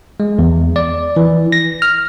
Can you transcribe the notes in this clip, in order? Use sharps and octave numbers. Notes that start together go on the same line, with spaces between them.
G#3
E2
D5
E3
A#6
F6